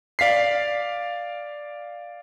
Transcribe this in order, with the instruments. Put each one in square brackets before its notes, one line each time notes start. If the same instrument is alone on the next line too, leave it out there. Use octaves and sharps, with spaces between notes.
[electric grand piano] D5 F5 B6 C7